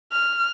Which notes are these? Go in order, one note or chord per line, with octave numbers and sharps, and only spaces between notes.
F6